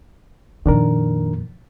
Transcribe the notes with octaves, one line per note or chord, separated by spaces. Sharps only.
F2 A#2 D#3 D4 A#4